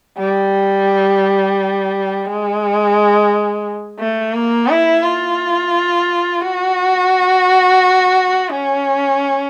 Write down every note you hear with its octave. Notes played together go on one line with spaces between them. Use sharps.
G3
G#3
A3
A#3
E4
F4
F#4
C#4